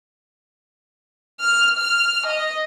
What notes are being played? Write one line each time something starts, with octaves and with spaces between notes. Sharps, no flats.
F6
F6
D#5